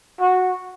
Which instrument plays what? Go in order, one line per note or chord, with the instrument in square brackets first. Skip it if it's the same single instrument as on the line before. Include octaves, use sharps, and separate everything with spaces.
[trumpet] F#4